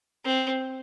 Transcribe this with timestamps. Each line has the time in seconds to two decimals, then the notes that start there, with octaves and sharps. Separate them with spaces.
0.25 C4